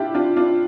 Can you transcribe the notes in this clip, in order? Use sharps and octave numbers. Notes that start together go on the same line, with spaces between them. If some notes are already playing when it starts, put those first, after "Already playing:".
Already playing: D4 E4 F4 G4
D4 F4
D4 F4